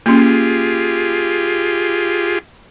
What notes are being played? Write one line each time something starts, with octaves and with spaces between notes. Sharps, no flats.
A#3 C#4 F4 G4 G#4